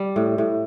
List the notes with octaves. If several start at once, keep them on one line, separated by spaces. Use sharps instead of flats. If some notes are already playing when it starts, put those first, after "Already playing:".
Already playing: G3
A2
A2